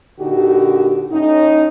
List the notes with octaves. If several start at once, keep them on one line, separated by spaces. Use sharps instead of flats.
A#2 D3 D#4 F#4 G4
A2 C#4 D#4